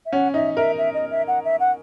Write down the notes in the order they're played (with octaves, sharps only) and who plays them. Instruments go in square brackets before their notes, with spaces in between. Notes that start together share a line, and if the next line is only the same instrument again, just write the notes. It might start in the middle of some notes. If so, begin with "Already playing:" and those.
[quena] E5
[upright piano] C#4 [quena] F#5
[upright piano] D#4 [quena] E5
[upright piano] A#4 [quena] E5
[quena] E5
D#5
E5
F#5
E5
F#5